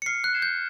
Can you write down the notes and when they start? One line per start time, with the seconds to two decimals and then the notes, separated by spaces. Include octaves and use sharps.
0.02 C#7
0.06 F6 C7
0.24 F#6
0.33 G#6 C7 E7 G7
0.42 G6